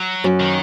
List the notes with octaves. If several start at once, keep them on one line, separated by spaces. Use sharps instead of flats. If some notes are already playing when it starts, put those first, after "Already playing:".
Already playing: F#3
F#2
D#3